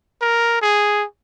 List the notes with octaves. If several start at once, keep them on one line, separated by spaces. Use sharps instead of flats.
A#4
G#4